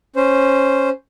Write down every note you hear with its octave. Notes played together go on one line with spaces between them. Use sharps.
C#4 C5